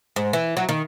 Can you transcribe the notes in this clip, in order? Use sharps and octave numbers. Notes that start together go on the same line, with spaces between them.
G#2
E3
F#3
D#3